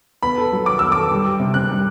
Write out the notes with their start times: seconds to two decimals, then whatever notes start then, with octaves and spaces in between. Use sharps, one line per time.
0.23 B3 B5
0.38 A4
0.52 F#3
0.66 F#4 D6
0.79 B3 E6
0.92 A4 D6
1.11 G3
1.25 G4
1.40 C3
1.54 C4 F#6
1.69 G3